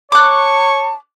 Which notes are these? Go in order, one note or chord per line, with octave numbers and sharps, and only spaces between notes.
C#5 A5 C#6 D6 F#6